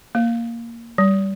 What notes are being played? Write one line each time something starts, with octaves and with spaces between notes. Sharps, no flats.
A#3
G3